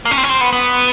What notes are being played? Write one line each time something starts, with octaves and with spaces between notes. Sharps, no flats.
A#3
C#4
C4
C#4
C4
B3
B3